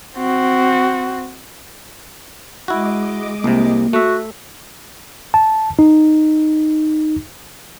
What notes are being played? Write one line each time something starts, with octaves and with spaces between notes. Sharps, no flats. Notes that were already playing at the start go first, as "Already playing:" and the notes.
C4 F#4
G#3 E4 F#4 D#5 D6
C2 C3 A#3
A3 F#4 E5
A5
D#4